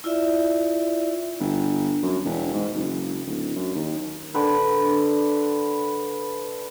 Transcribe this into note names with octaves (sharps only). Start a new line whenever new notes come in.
E4 F4 D5 E5
G1
F#2
E1
G#2
F#1
D1
F#2
D#2
D3 B4